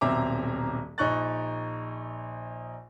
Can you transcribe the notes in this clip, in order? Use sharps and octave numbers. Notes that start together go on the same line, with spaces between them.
D#1 B1 C4 E5 A#5 D6
A#1 D#4 C#6 F#6 A6